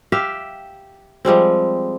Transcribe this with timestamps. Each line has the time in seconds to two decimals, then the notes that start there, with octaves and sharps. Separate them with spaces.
0.12 G4 E5 F5
1.25 F3 G3 G#3 C4